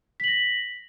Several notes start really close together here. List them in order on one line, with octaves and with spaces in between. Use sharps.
B6 F#7 A#6